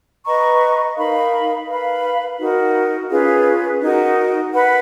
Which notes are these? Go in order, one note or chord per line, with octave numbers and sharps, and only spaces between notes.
B4 D#5 A#5 C#6
D#4 A#4 F5 B5
B4 F5 B5
D#4 F#4 A#4
C#4 F4 G#4 B4
D#4 F#4 A#4
B4 F#5 B5